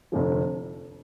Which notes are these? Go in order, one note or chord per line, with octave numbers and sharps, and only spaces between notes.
F1 F2 D3 F3